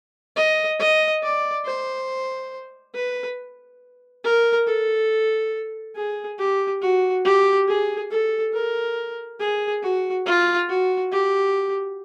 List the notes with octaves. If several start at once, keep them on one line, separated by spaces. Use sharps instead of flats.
D#5
D#5
D5
C5
B4
A#4
A4
G#4
G4
F#4
G4
G#4
A4
A#4
G#4
F#4
F4
F#4
G4